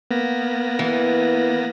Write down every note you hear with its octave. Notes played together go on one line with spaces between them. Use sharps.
A#3 B3 A#6
E3